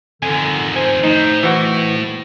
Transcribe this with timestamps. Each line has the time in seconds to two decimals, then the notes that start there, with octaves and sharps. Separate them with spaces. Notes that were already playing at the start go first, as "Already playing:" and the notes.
0.22 F2 D3 D#3 G#5
0.76 C5 G#5
1.03 A2 D#4
1.43 E3 F#4